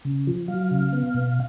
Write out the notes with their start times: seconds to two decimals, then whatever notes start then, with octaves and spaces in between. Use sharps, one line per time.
0.05 C#3
0.27 F3
0.48 F#3 F5
0.71 C#3
0.92 B3
1.14 B2